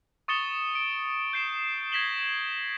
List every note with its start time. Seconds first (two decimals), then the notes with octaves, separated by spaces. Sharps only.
0.28 C#6 D#6 A6 C#7 E7 G7
0.75 D7
1.33 G6 C7 E7
1.92 G#6 A#6 B6 E7 F#7 G7